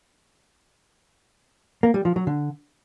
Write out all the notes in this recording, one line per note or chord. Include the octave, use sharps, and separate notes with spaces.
A#3
G3
F3
F#3
D3